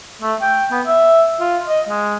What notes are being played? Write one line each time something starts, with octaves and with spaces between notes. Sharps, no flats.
A3
G5
B3
E5
F4
D#5
G#3